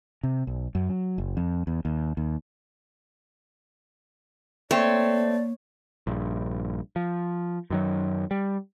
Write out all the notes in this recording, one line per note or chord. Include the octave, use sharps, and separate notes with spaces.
C3
B1
F#2
F#3
F#1
F2
E2
D#2
D#2
A3 A#3 C4 C#5 D5
A#1 G2
F3
F#2 D#3 F#3
G3